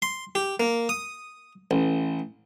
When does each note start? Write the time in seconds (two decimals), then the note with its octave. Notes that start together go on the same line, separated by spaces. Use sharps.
0.02 C6
0.35 G4
0.60 A#3
0.89 D#6
1.71 A1